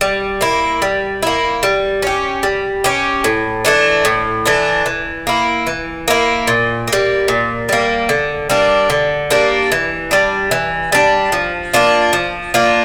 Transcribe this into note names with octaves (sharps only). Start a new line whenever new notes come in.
G3
A#3 E4
G3
A#3 E4
G3
C#4 G4
G3
C#4 G4
A2
E3 A3 D4
A2
E3 A3 D4
E3
A#3 E4
E3
A#3 E4
A#2
A#3
G3
A#2
G3 A#3
D3
G3 A#3 D4
D3
G3 A#3 D4
E3
G3 D4
E3
G3 D4
F3
A#3 D4 F4
F3
A#3 D4 F4